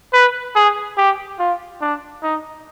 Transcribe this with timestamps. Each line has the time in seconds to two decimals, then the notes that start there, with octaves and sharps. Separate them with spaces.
0.13 B4
0.56 G#4
0.98 G4
1.39 F4
1.81 D4
2.23 D#4